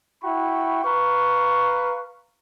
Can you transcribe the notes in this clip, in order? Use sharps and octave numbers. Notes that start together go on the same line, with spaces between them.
E4 F#4 G5 B5 C#6
B4 F5 A#5 C#6